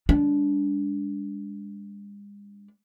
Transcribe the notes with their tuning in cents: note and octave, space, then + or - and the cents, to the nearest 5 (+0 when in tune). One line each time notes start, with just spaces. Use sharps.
G#3 -40 D4 -20